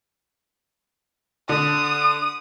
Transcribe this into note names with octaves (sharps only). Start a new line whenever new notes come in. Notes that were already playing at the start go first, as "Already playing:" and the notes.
D3 D#6